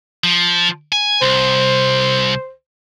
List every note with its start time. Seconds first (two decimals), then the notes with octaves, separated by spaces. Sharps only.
0.24 F3
0.92 G#5
1.22 C2 C5